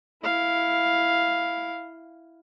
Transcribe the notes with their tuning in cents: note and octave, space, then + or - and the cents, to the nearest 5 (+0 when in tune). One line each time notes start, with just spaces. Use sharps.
E4 +0 F5 +0